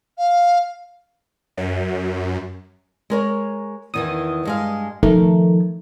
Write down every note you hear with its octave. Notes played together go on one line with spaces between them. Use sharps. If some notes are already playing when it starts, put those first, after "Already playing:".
F5
F#2
G#3 A#4 C#5
E2 D#3 E3 D#6
G2 G#3 F5
D#3 F3 A3 A#4